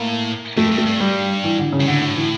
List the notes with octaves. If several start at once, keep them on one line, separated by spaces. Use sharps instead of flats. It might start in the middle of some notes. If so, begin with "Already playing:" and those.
Already playing: A2 A#3
F2 A3
G2
A3
G2
G3
E3
D3
C#3
G2
A2 D3
D3
E3